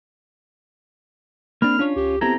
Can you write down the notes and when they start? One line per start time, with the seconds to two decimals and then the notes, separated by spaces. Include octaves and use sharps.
1.62 A#3 C4 D4 B5 F6
1.79 C#4 D4 F4 C#5
1.96 C#2 G4
2.21 B3 C4 E4 G4 A4 A#5 G#6